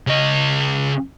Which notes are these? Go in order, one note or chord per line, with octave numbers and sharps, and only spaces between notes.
C#3 D#5